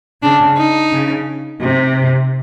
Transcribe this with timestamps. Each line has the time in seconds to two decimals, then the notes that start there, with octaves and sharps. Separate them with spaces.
0.23 C#3 D4
0.58 D#4
0.92 C#3
1.62 C3